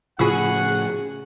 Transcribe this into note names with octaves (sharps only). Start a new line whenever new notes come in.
A2 C#3 F3 F4 F#4 G#4 F#5 E6